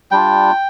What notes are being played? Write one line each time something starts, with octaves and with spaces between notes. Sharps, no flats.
G3 D4 F4 G5